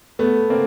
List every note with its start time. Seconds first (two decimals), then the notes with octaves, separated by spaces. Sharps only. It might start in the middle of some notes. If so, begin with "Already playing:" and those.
0.19 A3 B3
0.50 A#3 C4